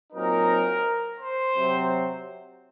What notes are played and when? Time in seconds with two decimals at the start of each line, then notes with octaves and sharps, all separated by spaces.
0.13 A#2 F#3 C4 D#4 A#4
1.19 C5
1.54 C3 F#3 C4